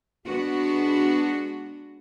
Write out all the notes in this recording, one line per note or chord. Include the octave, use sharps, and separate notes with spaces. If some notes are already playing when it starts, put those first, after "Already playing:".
G#3 B3 D4 F#4